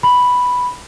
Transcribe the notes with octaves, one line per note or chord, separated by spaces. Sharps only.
B5